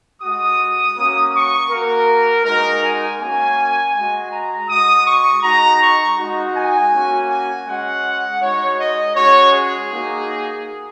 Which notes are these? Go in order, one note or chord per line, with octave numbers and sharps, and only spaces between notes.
G#3 F#4 D#6
A#3 C#4 F#4
C#6
A#3 F#4 A#4
G#3 D#4 F#4 A#4
G#5
A#3 C#4 F#4 G#5
G#3 F#4 G#5
A#5
G#3 F#4 D#6
C#6
G#3 D#4 F#4 A#5
C#6
G#3 D#4 F#4
G#5
A#3 C#4 F#4
G#5
G#3 C#4 F#4 F#5
G#3 D#4 F#4 C#5
D#5
G#3 C#4 F#4 C#5
G#4
A#3 D#4 F#4